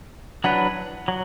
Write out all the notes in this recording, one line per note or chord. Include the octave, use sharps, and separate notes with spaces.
F#3 D4 B4 F#5
F#3